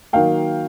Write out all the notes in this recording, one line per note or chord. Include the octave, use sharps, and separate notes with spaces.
D#3 F#3 A#3 F5 G5